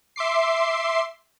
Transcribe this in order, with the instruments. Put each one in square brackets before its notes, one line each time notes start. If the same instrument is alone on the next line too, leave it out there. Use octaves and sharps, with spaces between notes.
[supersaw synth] E5 C6 D6 C7